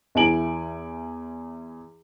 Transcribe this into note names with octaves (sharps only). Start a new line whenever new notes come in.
E2 E3 G#5 D7 F#7